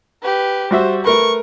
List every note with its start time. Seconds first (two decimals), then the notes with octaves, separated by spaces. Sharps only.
0.22 G4 B4
0.71 G3 F#4 C5 E5
1.05 A3 A#4 B4 C#6